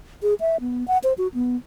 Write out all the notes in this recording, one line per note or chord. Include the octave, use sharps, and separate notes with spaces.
G#4
E5
B3
F#5
C5
F#4
B3